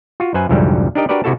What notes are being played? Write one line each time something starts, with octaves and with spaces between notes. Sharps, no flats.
F4 F#4
F#2 B4 C5 F#5 G#5
C2 F2 G#2 D3 F#3 G3
D4 D#4 G4 A#4 D#5
D4 F#4 G4 A#4 B4 D5
C3 E4 F#4 A4 A5